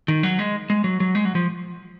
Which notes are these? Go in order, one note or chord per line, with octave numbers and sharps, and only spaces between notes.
D#3
F#3
G#3
G#3
F#3
F#3
G#3
F#3
F3